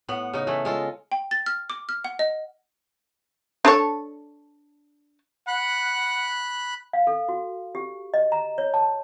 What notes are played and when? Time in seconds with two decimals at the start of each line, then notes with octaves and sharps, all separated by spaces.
0.08 A2 B3 F#5
0.33 C#3 D#4
0.47 E3 A3
0.65 G#3 F4 A4
1.12 G5
1.31 A6
1.46 F6
1.70 D6
1.89 F6
2.05 F#5
2.19 D#5
3.65 D4 A4 C#5
5.48 F#5 B5 F#6
6.93 F5
7.07 A4
7.29 F#4
7.75 G4
8.14 D#5
8.32 A#5
8.58 C#5
8.74 A5